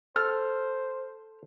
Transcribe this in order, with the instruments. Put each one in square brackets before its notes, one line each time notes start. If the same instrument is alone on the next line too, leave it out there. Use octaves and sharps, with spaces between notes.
[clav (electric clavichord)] A4 [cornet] C5 [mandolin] F6